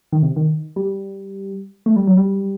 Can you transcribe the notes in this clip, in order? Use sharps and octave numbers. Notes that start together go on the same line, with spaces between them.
D#3
C3
D#3
G3
A3
G3
F#3
G3